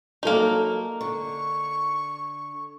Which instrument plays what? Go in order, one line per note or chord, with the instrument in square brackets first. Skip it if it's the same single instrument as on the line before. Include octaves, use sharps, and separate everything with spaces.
[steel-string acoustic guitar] F#3 A4 [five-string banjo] A#3 D#4
[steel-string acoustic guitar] D3 [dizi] C#6